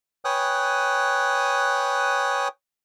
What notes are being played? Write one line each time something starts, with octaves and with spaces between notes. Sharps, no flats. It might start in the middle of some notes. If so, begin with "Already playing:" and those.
B4 C#5 G5 G#5 D#6 F#6